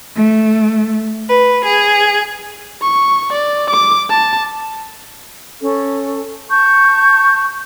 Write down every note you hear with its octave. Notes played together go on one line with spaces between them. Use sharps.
A3
B4
G#4
C#6
D5
D6
A5
C#4 A4
A5 C#6 G6